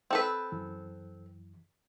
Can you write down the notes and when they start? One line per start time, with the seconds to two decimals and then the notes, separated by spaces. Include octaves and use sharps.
0.11 C4 A4 B4
0.52 F#2 E3